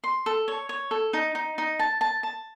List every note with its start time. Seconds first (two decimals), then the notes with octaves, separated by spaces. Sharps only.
0.04 C6
0.26 A4
0.48 C#5
0.69 C#5
0.91 A4
1.13 D#4
1.35 D#4
1.58 D#4
1.79 A5
2.01 A5
2.23 A5